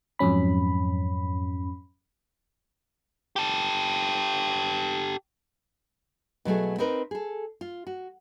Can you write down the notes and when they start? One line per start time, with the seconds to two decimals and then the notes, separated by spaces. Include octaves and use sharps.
0.19 F2 G#2 F#3 C#4 B5
3.36 G4 A4
6.45 B2 F#3 A3 G#4
6.78 C4 D#4 A#4 B4
7.11 G#4 A4
7.61 F4
7.87 F#4